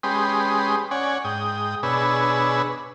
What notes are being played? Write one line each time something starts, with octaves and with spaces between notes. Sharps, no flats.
G#3 C#4 G4 B4 C6 D#6
C#4 C#5 D5 F#5 G#5
G#2 G5 D#6
B2 D4 G#4 B4 C#5 E6